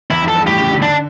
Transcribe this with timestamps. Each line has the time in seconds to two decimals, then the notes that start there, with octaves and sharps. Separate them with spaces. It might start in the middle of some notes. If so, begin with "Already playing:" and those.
0.10 E2 E4
0.22 F2
0.28 A4
0.35 G2
0.47 A2 G4
0.58 C#3
0.71 D3
0.82 D4